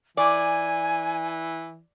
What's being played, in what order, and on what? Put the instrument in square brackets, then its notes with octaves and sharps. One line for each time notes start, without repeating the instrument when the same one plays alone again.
[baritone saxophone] E3 [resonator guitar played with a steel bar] D5 [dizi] G#5